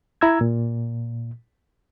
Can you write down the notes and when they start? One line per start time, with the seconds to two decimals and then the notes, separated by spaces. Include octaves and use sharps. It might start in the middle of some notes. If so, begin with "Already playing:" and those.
0.21 E4 A#5 E6 G#6
0.41 A#2